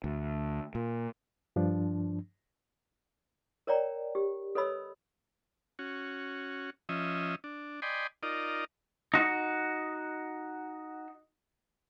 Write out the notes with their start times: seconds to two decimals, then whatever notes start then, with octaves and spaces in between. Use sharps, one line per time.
0.04 D2
0.75 A#2
1.56 G2 F3 D4
3.67 A#4 C#5 D5 G5 A#5
4.15 G4
4.55 A4 B4 C#5 D#5 B5 E6
5.79 C#4 F#4
6.89 F3 C#4 D#5 E5
7.44 D4
7.82 D5 D#5 G5 G#5 B5 C6
8.23 D#4 F4 A#4 D5 D#5
9.14 D#4 F#4